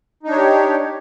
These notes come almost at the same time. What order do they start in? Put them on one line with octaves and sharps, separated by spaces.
D#4 D4 C#5 G4